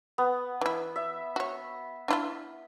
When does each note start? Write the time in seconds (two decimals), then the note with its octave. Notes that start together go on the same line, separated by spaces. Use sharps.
0.18 B3
0.61 E3 E4
0.96 E5
1.36 F#4 C#5
2.08 D4 E4 F4